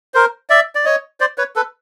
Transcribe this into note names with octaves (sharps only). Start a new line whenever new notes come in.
A#4 C5
D5 E5
D5
C#5 D#5
C5 D5
B4 C#5
A4 B4